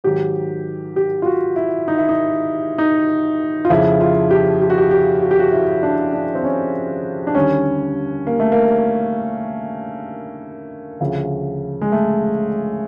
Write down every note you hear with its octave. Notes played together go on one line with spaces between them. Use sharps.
G#2 D#3 F#3 G4
G4
F4
F#4
E4
D#4
E4
D#4
D#4
F4
F2 C#3 F3 E4
F4
G4
G4
F#4
G4
G4
F#4
G4
F#4
E4
D4
D4
C4
C#4
D4
D#2 D3 G3 C#4
A#3
A3
A#3
D2 C#3 F3
G#3
A3